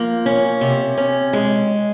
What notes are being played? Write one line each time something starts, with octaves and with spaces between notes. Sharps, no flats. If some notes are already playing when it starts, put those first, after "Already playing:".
Already playing: F3 A#3
C#4
C3
C#4
G#3